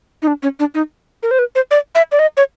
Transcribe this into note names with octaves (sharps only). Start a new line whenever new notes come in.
D#4
D4
C#4
D4
D#4
A#4
C5
B4
C5
D5
E5
D5
D#5
C#5